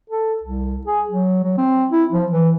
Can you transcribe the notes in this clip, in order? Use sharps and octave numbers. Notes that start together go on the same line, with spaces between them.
A4
C2
G#4
F#3
F#3
C4
E4
F3
E3